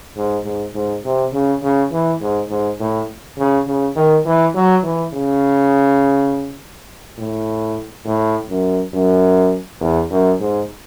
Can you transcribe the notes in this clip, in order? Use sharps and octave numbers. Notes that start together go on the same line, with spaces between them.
G#2
G#2
G#2
C3
C#3
C#3
E3
G#2
G#2
A2
C#3
C#3
D#3
E3
F#3
E3
C#3
A2
A2
F#2
F#2
E2
F#2
G#2